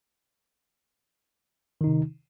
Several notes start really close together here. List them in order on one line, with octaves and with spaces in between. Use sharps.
D#3 D#4 C3